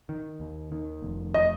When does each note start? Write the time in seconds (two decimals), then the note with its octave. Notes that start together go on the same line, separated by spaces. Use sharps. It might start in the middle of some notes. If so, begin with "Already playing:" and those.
0.09 D#3
0.40 D#2
0.72 D#3
1.02 F1
1.34 D#5